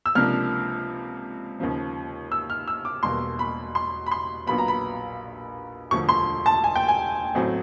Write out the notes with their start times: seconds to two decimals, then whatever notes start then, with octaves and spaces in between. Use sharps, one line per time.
0.06 E6
0.15 C#2 C3 F3 A#3 D4 F6
1.60 D#2 C#3 F3
2.32 E6
2.50 F6
2.68 E6
2.85 D6
3.03 E1 E2 B2 G3 A#3 C6
3.39 B5
3.75 C6
4.06 B5
4.11 C6
4.47 A#1 A#2 F#3 B3 B5
4.58 A#5
4.68 B5
5.91 E1 D2 D3 F3 C#6
6.09 C6
6.46 A5
6.64 G#5
6.75 G5
6.88 G#5
7.35 A1 A2 F#3 A3 C4